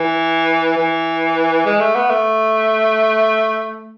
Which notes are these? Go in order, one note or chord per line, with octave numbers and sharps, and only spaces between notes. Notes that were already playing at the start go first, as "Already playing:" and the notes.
Already playing: E3
E3
G#3
A3
B3
A3